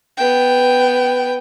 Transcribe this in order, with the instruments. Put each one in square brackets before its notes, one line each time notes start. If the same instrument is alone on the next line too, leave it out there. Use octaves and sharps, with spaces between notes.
[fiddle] B3 G5